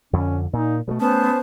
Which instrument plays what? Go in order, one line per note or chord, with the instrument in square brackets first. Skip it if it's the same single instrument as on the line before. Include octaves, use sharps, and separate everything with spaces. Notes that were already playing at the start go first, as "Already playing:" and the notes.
[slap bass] F2 D3 [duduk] C#4
[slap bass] A#2 [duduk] D#4
[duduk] B2 [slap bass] G3 A3
[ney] B3 [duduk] C#4 [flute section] C5 A5